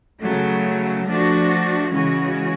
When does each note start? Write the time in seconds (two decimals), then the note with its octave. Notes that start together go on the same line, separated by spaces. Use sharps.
0.21 C#3 F#3 A3
1.06 F3 A3 D4 F#4
1.90 C#3 E3 G#3 C#4 F#4